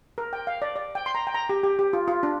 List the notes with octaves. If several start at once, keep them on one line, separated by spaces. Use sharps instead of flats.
A#4
G5
F5
D5
D5
G5
C6
A#5
G5
A#5
G4
G4
G4
F4
F4
D4